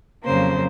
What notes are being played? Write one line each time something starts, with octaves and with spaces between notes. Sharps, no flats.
F2 C#3 F#3 A#3 C5